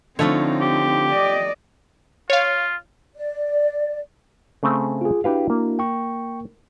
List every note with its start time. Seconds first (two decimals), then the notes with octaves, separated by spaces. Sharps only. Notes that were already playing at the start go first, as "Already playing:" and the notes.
0.19 D3 F3 A3 C4 D#4 F4 C#5
0.61 G4
1.10 D5 D#5
2.30 F4 C#5 F5
3.15 D5
4.63 C#3 A3 C4
5.01 F4 G#4
5.24 D4 E4 F#4 G4 B4 F5
5.50 A#3
5.79 G5 C#6